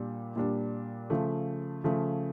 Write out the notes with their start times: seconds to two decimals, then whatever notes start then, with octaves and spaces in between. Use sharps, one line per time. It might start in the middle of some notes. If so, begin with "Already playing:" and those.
Already playing: A#2 G3 D4
0.36 A#2 G3 D4
1.10 C#3 F3 A3
1.84 C#3 F3 A3